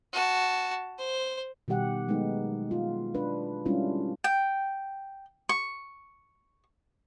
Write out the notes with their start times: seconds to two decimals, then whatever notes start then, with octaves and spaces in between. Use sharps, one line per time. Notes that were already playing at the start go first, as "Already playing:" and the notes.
0.13 F#4 A5
0.99 C5
1.68 B2 D#3 G3 G4 F#5
2.08 F#3 G#3 A3 B3 D#4
2.71 F4
3.15 D4 B4
3.65 G3 G#3 C#4 D4 E4 F4
4.24 G5
5.49 C#6